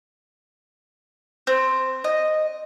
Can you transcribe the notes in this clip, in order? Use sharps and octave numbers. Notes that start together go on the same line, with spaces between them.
C4
D#5